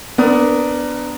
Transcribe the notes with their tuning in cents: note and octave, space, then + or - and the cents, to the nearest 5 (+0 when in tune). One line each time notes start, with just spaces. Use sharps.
B3 +20 D4 +0 A#4 +0